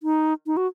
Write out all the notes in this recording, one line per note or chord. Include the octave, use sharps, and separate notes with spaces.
D#4
D#4
F#4